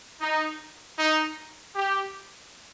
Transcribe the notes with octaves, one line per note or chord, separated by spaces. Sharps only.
D#4
D#4
G4